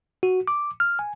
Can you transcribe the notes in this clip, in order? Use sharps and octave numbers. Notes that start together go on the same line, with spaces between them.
F#4
D6
F6
G#5